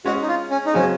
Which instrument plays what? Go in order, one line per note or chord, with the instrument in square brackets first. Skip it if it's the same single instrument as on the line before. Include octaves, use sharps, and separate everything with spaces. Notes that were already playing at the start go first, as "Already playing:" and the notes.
[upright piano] G#3 C#4 G#4 D#5 [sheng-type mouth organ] F#4
[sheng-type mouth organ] D#4
F4
C#4
D#4
[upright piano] C#3 F#3 C4 [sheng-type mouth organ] C#4